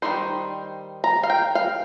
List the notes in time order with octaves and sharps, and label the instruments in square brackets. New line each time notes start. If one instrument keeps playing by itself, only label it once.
[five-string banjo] D#3 G3 D#4 C5
A#5
F5
G5
F5